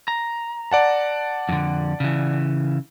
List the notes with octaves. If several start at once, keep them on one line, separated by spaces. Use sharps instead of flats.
A#5
D5 F#5 A5
F2 D3
C#3 E3